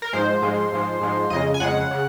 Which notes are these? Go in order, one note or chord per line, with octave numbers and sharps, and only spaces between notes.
A#4
G#2 F3 G#3 C5
G#2 F3 G#3
G#2 F3 G#3
G#2 F3 G#3
F2 C#3 G#3 D#5
G#5
F2 C#3 G#3 F#5
C#3